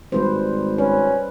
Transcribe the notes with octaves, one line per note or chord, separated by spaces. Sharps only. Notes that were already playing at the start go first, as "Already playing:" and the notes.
G#1 G3 B4 C5
C#4 B4